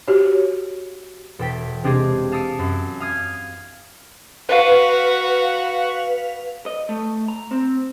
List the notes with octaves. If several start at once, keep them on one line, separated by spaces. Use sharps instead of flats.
F#4 G4 C#5
E1 A4 G5 B6
C3 G#3 C4 D4 G4 G#4
F5 A5 D#6 E6 C#7 D7
F#2
F5 D#6 F6 G#6
F#4 B4 F5
D#5
A3
A#5
C4